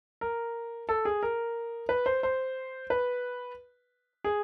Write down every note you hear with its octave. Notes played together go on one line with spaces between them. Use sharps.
A#4
A4
G#4
A#4
B4
C5
C5
B4
G#4